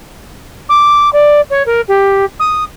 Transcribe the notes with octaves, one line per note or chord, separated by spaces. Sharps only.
D6
D5
C#5
A#4
G4
D#6